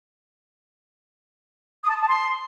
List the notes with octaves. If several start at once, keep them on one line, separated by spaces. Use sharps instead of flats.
D#6
A5
D#6
A5
C6